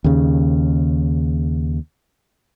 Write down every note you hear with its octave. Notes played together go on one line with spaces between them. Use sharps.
D#2 C#3